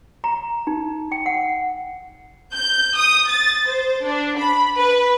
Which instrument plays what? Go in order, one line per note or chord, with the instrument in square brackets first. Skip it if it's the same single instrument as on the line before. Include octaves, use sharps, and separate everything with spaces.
[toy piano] A#5
D#4
G5
F#5
[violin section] G6
D#6
A6
C5
D4
B5
B4